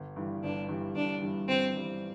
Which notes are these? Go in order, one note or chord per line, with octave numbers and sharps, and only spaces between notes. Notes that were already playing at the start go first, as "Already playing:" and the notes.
Already playing: G1
G2 E3 G3
G1 D4
G2 E3 G3
G1 D4
G2 E3 G3
G1 C4
G2 E3 G3